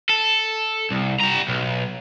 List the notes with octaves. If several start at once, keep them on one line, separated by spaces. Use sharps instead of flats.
A4
C2
G3 A#5
B1